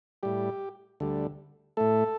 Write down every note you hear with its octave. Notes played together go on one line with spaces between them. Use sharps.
A2 G3 G4
D2 D3 G3
A2 A3 A4